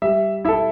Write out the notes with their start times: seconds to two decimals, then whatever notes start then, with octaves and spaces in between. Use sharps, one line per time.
0.02 G3 E5
0.45 E4 A4 E5